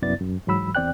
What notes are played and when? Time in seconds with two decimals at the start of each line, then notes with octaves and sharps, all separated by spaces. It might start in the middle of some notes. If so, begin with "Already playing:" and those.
0.02 C2 F#2 B3 E4 D5 A6
0.21 F#2
0.47 G#2 E3 F#3 B5 E6
0.75 E2 C4 D5 G5 F#6